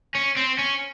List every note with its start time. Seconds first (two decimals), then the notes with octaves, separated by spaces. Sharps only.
0.15 C#4
0.36 C4
0.58 C#4